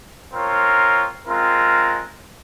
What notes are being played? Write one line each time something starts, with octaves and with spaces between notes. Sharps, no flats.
C4 F4 A#4 C#5
G#3 C4 F4 A#4